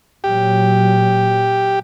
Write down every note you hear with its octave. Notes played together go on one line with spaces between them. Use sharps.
A#2 F#3 G4